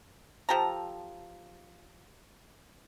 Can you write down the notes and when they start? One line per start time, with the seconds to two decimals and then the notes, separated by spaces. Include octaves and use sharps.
0.49 F3 G4 A4 A#5